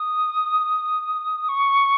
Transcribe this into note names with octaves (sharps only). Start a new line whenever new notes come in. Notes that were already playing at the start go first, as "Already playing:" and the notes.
Already playing: D#6
C#6